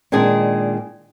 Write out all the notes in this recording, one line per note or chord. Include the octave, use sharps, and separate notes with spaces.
A#2 D#3 G#3 D4 G#4